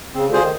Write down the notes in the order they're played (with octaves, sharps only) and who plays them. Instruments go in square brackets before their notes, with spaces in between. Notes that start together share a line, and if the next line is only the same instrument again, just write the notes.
[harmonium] C#3 [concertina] C4
[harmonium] D2 D3
[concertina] F4 G#4 C5
[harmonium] D#3